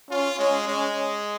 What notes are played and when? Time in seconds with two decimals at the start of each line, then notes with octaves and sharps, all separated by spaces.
0.11 C#4 F4
0.38 G#3 C#4
0.67 G#3 C#4